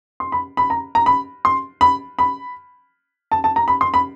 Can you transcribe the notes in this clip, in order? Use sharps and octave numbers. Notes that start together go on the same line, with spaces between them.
C6
B5
B5
A#5
A#5
B5
C6
B5
B5
A5
A5
A#5
B5
C6
B5